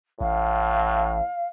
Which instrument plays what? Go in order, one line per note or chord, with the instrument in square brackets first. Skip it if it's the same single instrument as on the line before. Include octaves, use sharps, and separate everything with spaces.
[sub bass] A1 [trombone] A2 [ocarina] F5